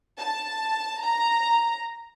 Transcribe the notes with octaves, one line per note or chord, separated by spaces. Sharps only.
A5
A#5